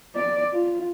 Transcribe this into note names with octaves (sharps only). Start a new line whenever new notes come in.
D5
F4